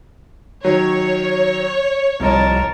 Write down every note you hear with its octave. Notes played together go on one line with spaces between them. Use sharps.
D#3 F#3 C#5
C2 F3 A#4 D#5 A5